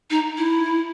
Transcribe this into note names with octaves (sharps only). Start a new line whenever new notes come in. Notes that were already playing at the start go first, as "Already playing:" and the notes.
D#4
E4